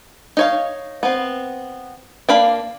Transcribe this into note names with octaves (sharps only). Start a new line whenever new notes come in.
D#4 C#5 F5
B3 C4
A#3 D4 F5 B5